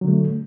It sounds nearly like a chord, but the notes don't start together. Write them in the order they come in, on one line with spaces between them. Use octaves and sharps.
F#3 D3 A3